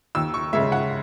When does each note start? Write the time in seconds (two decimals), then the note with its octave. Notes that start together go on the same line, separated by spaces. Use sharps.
0.15 D#2 E6
0.34 C#6
0.53 C#3 G#3 E5
0.72 F#5